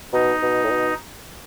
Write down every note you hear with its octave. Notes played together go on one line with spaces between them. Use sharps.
B2 D#4
B2
A2
B2